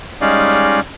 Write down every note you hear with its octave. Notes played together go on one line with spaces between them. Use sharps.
G3 G#3 C#4 D#4 D5 F5